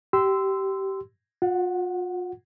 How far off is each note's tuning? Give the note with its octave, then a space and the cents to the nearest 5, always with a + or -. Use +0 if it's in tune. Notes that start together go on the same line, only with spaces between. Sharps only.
G4 -20 C6 -20 E6 +0
F4 +40 F#5 +0